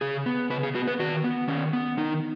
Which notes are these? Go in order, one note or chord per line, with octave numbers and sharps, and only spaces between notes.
C#3 G#4
B3
C#3 B4
G#4
B3 F#4
B4
D#3 F#4
B3
D#3 C#4
B3
D#3 D#4